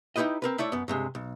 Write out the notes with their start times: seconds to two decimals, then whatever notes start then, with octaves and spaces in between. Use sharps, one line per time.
0.16 D#4 E4 F#4 G4 B4 D#5
0.42 C4 A#4 B4
0.58 A3 E4 C#5 D5
0.72 F#2 B3
0.88 G2 C3 G#3
1.15 B1